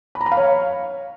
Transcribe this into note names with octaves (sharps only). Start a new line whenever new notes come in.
B5
A#5
B5
F5
C#5